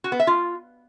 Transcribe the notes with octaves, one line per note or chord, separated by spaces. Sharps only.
F#4
B3
E5
F4